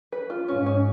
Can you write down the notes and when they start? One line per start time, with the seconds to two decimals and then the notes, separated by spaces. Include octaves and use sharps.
0.12 B4
0.30 F4
0.48 G#2 C#4
0.66 C#4